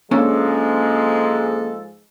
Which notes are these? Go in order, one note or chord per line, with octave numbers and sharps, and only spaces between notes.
G#2 F3 G#3 A#3 C#4 D4 A4